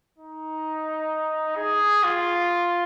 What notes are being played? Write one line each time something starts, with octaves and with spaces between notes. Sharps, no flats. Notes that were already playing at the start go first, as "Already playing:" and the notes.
D#4
G#4
F4